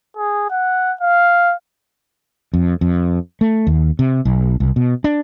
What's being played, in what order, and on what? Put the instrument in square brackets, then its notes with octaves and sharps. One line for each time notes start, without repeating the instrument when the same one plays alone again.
[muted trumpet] G#4
F#5
F5
[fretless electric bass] F2
F2
A3
D#2
C3
B1
C2
B2
D4